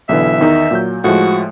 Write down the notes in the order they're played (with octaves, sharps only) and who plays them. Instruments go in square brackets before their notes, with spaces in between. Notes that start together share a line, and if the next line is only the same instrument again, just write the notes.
[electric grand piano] B1 D3 E3 [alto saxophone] E5
[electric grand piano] E2 D#3 D#4
A#2 F#3 G6
[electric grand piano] A2 F3 G#3 [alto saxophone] F#4